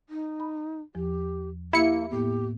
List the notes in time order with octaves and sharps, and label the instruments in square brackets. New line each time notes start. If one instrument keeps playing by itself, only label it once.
[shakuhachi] D#4
[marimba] B5
[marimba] E2 F3 [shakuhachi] G4
[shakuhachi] A#3 [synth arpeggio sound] E4 C#7 [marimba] G4
[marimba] A2 A#3 B3 [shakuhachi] G4